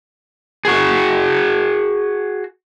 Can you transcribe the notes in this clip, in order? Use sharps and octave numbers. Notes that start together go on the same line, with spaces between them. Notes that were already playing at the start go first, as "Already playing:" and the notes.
F#4 G#4